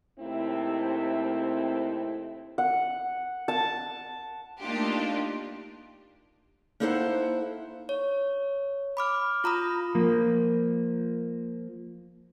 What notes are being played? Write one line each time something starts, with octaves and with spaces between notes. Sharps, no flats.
D#2 C3 A3 C4 E4
F#5
A5
A3 A#3 D4 D#4 F4 G4
A#3 D#4 E4 A4 C5 F#5
C#5
B5 D6 F6
F4 A#5 B5 D#6
F3 A#3